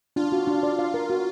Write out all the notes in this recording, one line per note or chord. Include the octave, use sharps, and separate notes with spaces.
D4 F4
F#4
D4
D5
F5
A#4
F#4